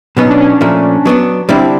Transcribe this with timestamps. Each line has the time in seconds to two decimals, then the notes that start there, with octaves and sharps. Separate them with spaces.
0.16 B2 F#3 B3 C#4 D#4
0.29 D4
0.40 C#4
0.61 A#2 F3 A3
1.05 F#3 B3 D4
1.49 D3 G3 C4 D4 E4